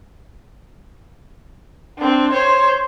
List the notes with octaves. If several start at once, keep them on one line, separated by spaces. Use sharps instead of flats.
C4 D4
C5 C#5